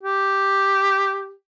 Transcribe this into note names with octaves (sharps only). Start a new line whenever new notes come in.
G4